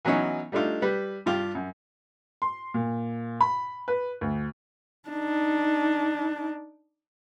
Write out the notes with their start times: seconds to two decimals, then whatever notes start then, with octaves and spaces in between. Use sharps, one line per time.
0.05 E3 F#3 B3 C#4 D#4
0.52 G3 A3 D4 D#4 F4
0.82 G3 B4
1.26 G2 F4 G4
1.55 F#2
2.42 C6
2.74 A#2
3.41 B5
3.88 B4
4.21 D2
5.09 D4 D#4